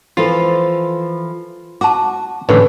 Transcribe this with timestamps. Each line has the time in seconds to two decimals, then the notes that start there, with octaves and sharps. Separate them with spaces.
0.17 E3 F3 F4 A4
1.81 F#4 A5 D6
2.49 A2 D3 E3 C#4 B4